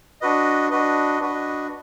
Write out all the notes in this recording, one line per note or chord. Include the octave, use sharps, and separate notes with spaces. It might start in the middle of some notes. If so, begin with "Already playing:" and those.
D4 F#4 B4 D#5
D4 F#4 B4 D#5
D4 F#4 B4 D#5